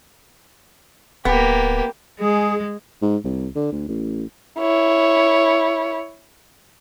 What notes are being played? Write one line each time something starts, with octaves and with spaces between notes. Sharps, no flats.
D1 A#3 B3 G4
G#3 G#4
G#2
C2
D3
D2
A1
E4 C#5